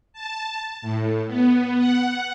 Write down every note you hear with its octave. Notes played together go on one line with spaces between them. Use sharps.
A5
A2
B3
F#5